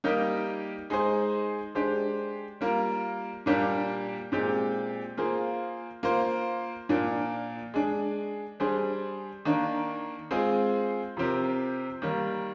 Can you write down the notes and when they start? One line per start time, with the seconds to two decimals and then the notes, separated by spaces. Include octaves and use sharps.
0.04 G3 A#3 D#4 G4 A#4
0.90 G#3 D#4 G#4 C5
1.75 G#3 D4 G4 C5
2.61 G3 A#3 F4 A#4
3.46 A#2 G3 A#3 D4 G4
4.32 A#2 G#3 C4 G4
5.17 A#3 F4 G#4 C5
6.03 A#3 F4 C5
6.89 A#2 F3 A#3 D4
7.74 G#3 D4 G#4
8.60 G3 D4 G#4 C5
9.45 D#3 A#3 D4
10.31 G#3 C4 F4 G#4 C5
11.17 C3 F3 C4 G4 A#4
12.02 D#3 G3 A#3